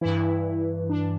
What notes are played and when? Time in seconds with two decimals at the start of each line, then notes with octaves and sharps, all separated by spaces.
0.01 G2 E3 E4
0.89 D4